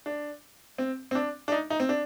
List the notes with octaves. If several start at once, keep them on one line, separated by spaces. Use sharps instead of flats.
D4
C4
C4
D4
D4
D#4
D#4
C4
D4